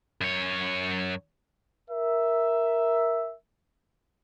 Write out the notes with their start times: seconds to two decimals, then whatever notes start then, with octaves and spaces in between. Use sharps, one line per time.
0.21 F#2 C#5
1.90 A#4 E5